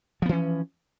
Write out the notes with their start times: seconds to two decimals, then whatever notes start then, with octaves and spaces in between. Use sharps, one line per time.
0.22 F3
0.26 B3
0.29 E3
0.33 C#4